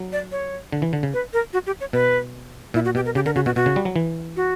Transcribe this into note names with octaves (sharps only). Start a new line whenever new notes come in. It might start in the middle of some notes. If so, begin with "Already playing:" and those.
Already playing: F#3
D5
C#5
D3
E3
D3
C#3
B4
A#4
F#4
G4
C#5
B2 B4
A#2 E4
F#4
B2 G4
A#4
C#3 G4
D3 A#4
C#3 F#4
B2 F#4
B2 F#4
C#3
G3
F#3
E3
F#4